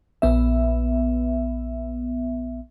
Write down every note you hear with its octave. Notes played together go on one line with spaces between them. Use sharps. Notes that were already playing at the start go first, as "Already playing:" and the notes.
A#1 B3 E5